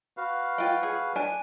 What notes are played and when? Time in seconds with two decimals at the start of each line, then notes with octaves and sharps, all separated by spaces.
0.17 F#4 B4 F5
0.58 F4 G5
0.83 G#4
1.15 D4 G#5